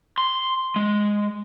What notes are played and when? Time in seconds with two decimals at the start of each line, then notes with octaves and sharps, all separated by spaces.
0.18 C6
0.76 G#3